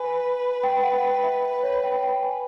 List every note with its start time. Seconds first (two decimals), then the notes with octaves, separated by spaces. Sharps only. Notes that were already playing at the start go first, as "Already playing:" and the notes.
Already playing: B4 G#5
0.63 G5
0.83 F#5
1.03 G5
1.24 E5
1.63 C#5
1.84 G5
2.03 G5
2.23 G#5